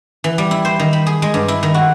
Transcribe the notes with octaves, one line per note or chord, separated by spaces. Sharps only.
E3
G3
E4
C5
D#3
B5
G#4
G#3
G2
E4
D#3
F#4